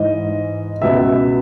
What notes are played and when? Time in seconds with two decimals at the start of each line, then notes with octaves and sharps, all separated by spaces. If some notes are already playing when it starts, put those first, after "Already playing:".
Already playing: G#2 E3 D#5
0.82 C#2 B2 E5